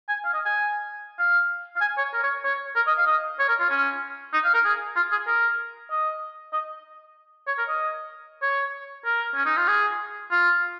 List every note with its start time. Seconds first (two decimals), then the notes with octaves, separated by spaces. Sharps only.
0.09 G#5
0.24 F5
0.34 D#5
0.46 G#5
1.19 F5
1.76 F5
1.81 G#5
1.98 C#5
2.14 A#4
2.24 C#5
2.45 C#5
2.76 A#4
2.87 D#5
2.98 F5
3.07 D#5
3.40 C#5
3.49 A#4
3.60 F4
3.70 C#4
4.34 D#4
4.45 F5
4.54 A#4
4.65 G#4
4.96 F4
5.12 G#4
5.28 A#4
5.91 D#5
6.53 D#5
7.48 C#5
7.58 A#4
7.69 D#5
8.43 C#5
9.05 A#4
9.35 C#4
9.46 D#4
9.57 F4
9.68 G#4
10.31 F4